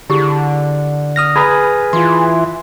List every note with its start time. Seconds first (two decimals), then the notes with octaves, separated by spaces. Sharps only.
0.10 D3 E4 G4 G#4
1.16 D#6 F6 A#6
1.36 G#4 B4 A#5 B5
1.93 E3 F4 C6